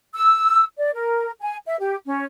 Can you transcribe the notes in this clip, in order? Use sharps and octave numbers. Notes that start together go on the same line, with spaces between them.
E6
D5
A#4
G#5
E5
G4
C#4